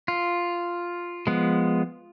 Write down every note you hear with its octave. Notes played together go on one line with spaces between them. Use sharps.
F4
F3 G#3 B3